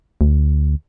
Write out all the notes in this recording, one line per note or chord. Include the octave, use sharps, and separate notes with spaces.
D2